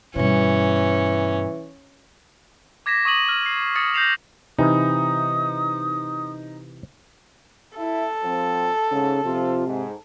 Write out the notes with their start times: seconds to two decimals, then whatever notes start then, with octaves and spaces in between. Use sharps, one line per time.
0.16 G2 B2 E3 C#4
2.86 D6 G#6 A#6 B6 E7
3.05 C#6 D#6 D#7 F#7
3.29 F6
3.46 C7
3.76 D#6 A6 C#7
3.94 G6 A#6 C7 E7 F7
4.58 C3 E3 D#4 D#6
7.77 E4 A4
8.24 F3 C4
8.92 G#2 C#3
9.25 C3 F3 F4
9.67 G#2